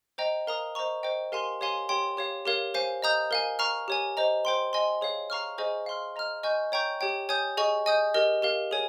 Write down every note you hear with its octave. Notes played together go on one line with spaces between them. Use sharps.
C5 D#5 G5 A#5
A#4 F5 A#5 D#6
C5 D#5 A#5 C#6
C5 D#5 G5
G4 A#4 F5 G#5 C6
G4 C#5 F5 G#5 C6
G4 C#5 G5 C6
G4 C#5 F5
G4 A#4 C#5 F5
C5 F5 G#5
D#5 A#5 D#6 G6
A#4 F5 G#5
F5 A#5 C#6 F6
G4 C#5 G#5
C5 D#5 A#5
C5 G5 C6
D#5 G#5 C6
G#4 C#5 F5
F5 A#5 C#6 F6
G#4 C5 D#5 G#5 C#6
F5 C6 F6
D#5 A#5 F6
D#5 G#5 C#6 G6
C#5 G5 A#5 C#6 G6
G4 C#5 G5
C#5 G#5 D#6 G6
G#4 D#5 G#5 C#6
D#5 G#5 D#6 G6
G4 A#4 D#5
G4 A#4 F5
G#4 C#5 G#5